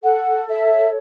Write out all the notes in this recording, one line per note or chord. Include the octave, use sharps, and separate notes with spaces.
A4 F#5
C#5 E5